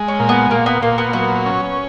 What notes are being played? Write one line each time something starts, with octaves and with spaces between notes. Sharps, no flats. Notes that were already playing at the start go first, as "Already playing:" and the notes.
Already playing: G#3
C#4
A#2
B3
A#2 A#3
B3
A#2 A#3
B3
F#3 B3
C#4